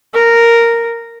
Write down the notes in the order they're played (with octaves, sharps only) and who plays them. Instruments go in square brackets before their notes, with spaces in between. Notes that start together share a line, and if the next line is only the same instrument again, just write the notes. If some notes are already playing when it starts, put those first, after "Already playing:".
[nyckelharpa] A#4